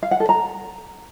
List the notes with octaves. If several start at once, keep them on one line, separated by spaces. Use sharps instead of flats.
F5
F#5
A4
A#5